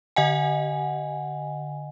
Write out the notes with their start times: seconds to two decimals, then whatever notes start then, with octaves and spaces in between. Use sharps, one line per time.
0.16 D3 D#5 F#5 G#5